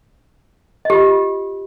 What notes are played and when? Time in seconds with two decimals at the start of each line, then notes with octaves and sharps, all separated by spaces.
0.85 D#5
0.90 G4
0.94 F4